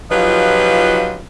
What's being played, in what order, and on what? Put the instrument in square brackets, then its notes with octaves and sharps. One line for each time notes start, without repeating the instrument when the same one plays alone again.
[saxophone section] F3 F#3 D#4 F4 G4 B4